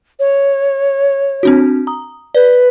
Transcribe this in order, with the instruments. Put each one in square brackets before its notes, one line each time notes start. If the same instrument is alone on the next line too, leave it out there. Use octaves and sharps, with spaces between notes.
[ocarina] C#5
[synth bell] C4 D4 F#4
A#5 D#6
[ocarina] B4 [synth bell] D5